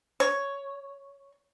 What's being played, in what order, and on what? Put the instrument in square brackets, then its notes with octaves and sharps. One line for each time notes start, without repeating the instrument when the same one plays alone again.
[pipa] C#5